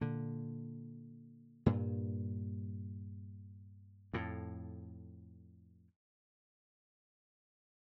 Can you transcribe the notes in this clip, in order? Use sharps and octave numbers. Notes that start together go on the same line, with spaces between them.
A#2 D3
G2 A#2
F2 A2